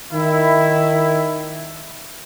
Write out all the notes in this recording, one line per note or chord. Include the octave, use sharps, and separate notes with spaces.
D#3 E4